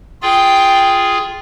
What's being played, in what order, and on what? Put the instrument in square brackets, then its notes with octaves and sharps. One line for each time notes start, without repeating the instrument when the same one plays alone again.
[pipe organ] F4 G#4 [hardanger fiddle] G5